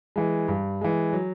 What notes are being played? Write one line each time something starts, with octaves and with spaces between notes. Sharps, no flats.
E3 G#3
G2
E3 G#3
F#3